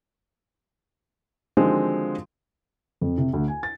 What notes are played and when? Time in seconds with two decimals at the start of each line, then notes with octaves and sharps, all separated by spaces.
1.57 D3 D#3 F3 F#3 G#3 C4
3.01 F2
3.18 C3
3.33 D2
3.48 G#5
3.63 A6